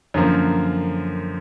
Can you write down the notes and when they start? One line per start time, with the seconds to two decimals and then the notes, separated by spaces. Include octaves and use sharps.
0.14 F#2 D3 F3 A#3